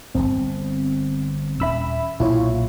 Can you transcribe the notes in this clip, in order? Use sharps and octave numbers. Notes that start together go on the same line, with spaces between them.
D1 G1 C4
D#1 C#4 E5 B5 E6
B1 A#2 E4 F4 C#5